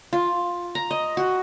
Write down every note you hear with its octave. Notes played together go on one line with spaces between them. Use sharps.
F4
A#5
D#5
F#4